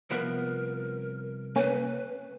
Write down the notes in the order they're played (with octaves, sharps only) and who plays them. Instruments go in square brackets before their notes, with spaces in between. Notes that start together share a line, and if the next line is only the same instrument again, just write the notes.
[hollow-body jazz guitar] C2 F3 B3 [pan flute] A#4
[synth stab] A#3 C#4 [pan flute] B4